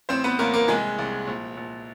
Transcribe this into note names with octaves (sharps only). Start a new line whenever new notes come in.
A1 C4 C5
B3 B4
A1 A#3 A#4
A#3 A#4
C2 G#3 G#4
C2
A#1
A#1